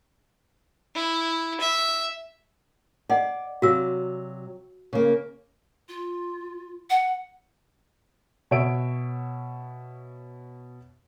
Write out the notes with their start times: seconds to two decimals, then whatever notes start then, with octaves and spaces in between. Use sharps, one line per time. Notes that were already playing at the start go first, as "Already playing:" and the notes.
0.95 E4
1.60 E5
3.10 D5 D#5 F#5
3.62 C3 F#3 F#4 F5 E6
4.93 C#3 A#3
5.89 F4
6.90 F#5
8.51 B2 C#5 E5 D7